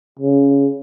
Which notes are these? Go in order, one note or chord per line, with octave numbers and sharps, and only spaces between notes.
C#3